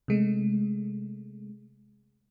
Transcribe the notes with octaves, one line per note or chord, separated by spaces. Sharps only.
C3 G#3 A3